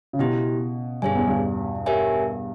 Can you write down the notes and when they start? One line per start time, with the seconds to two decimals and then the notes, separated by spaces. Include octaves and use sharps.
0.13 C#3
0.19 B2 B3 E4 G4
1.02 G2 G#4 C#5 G#5
1.15 E2
1.28 G2
1.86 G4 A#4 C#5 E5 G#5